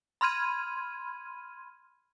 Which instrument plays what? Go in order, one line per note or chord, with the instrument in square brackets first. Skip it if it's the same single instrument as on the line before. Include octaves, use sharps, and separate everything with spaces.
[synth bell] B5 C6 F6 G#6 D#7